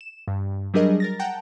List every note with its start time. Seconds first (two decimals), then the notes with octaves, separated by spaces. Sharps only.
0.01 E7
0.28 G2
0.74 F#3 G3 D4 G#4 A#4 D#5
1.00 A#4 A6 A#6
1.19 F#5 G5 A5 A#5